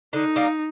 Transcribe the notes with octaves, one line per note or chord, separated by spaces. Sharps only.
D3 D#4
G3 A#3